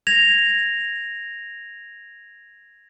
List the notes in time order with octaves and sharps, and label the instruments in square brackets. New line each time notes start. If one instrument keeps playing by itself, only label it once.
[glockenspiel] G#6 A#6 F7